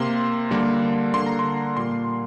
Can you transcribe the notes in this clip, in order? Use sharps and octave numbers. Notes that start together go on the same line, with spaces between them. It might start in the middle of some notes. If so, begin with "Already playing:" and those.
Already playing: C3 A#3 C6
D3 G3 A#3
D3 A#3 C6
A#5
C6
A#2 G3 A#3 C6